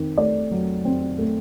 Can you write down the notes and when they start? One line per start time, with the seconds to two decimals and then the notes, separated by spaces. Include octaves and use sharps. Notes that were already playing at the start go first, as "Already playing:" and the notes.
Already playing: D#3 C4
0.18 A3 D5
0.51 F#3
0.85 C4
1.19 A3